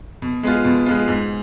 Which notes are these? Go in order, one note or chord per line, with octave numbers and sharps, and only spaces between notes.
B2
G#3 B3 F4
B2
G#3 B3 F4
G#2